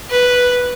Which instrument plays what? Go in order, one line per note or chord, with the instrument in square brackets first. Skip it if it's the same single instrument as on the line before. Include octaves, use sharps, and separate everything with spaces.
[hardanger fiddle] B4